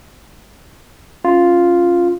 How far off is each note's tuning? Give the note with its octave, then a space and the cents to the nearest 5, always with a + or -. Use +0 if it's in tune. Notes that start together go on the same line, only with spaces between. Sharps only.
C#4 -5 F4 +0